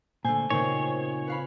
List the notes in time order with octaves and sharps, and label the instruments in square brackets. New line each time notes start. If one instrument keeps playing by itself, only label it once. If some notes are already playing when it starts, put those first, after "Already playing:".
[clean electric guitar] A#2 D3 [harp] A3 C5 [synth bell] G#5
[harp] A#2 C#3 C4 [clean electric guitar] D#4 C5 D#5 [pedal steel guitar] C#5
[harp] B4 F5 B5